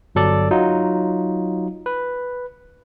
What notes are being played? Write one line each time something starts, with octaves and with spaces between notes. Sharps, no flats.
G1 F#3 A4 D5
F#3 D#4 F4
B4